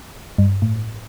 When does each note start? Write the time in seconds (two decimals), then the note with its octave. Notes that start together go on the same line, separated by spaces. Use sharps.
0.38 G2
0.62 A2